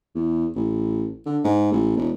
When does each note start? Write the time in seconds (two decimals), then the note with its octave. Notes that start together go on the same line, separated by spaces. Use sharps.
0.15 E2
0.56 A1
1.26 D3
1.44 G#2
1.72 A1
1.97 E1